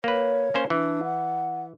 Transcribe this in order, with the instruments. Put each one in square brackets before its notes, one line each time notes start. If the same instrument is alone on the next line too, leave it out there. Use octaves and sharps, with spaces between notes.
[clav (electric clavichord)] A#3 B4 [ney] C#5
[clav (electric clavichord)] A#3 C#4 C5
[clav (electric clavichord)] E3 [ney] D4
[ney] F#5